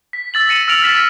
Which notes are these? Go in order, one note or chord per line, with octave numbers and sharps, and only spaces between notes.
B6
E6 A6 F#7
A6 A#6 C#7 D#7 E7 F#7
E6 F6 A#6 D7 F7 F#7
F6 A6 B6 E7
E6